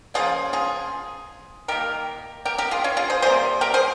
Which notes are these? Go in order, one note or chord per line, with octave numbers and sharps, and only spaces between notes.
C#3 F3 A#3 F4 G#4
F4 G#4
D#3 A#3 G4 A#4
G4 A#4
G4 A#4
F4 G#4
C#4 F4
F4 G#4
G#4 C5
C3 G3 A#3 G#4 C5
G4 A#4
G#4 C5